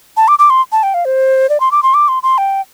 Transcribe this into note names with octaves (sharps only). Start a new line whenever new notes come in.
A5
D6
D6
C6
A5
G5
F5
C5
D5
C6
D6
C6
D6
C6
C6
G5